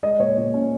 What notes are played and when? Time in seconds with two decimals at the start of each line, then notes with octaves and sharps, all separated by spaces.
0.03 G#3 D#5
0.19 A#2 C#5
0.38 A#2
0.54 C#4